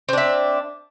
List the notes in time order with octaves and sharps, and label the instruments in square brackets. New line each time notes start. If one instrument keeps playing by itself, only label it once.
[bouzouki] C4
D4
E5